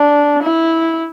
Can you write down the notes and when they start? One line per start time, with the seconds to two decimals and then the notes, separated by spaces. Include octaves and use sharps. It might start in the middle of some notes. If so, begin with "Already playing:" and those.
Already playing: D4
0.43 E4